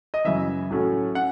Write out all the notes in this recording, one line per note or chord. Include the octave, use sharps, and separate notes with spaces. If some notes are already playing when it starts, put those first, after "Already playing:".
D#5
F#2 C#3 E3 E5
A2 F#3 A3 C#4
C#4 F#5